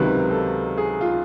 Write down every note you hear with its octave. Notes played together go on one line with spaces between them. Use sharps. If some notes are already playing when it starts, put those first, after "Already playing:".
Already playing: C#2 C3 D#3 F#3 B4
A4
G#4
F4